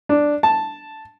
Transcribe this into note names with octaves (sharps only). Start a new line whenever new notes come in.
D4
A5